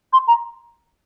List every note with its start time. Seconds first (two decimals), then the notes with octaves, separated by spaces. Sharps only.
0.13 C6
0.28 A#5